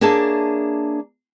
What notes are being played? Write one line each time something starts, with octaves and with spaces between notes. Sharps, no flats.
A#3 D4 G#4 C#5 E5 A5